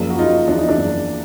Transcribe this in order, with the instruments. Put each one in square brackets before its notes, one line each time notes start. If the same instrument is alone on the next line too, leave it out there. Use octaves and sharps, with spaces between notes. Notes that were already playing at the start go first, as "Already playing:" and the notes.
Already playing: [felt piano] F#1 F3
[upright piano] F#4
[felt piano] F#1 [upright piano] D#4 F4
[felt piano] E2 [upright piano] D4
[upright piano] D#4
D4
[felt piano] F#1